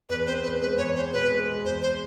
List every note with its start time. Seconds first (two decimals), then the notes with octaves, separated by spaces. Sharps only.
0.09 E2 B4
0.27 C4 C5
0.43 E2 B4
0.61 G#3 B4
0.78 E2 C#5
0.95 C4 C5
1.13 B2 B4
1.30 G#3
1.47 G#3
1.65 E2 C5
1.82 C5